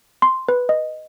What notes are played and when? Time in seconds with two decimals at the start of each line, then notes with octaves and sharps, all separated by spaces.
0.22 C6
0.49 B4
0.69 D#5